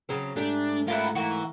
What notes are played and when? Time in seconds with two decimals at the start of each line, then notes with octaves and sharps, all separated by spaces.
0.09 C#3 F#3 C4
0.36 G#2 A3 D4 G4
0.88 A#3 E4 F4 G#4 F#5
1.15 E3 A#3 F#4 C#6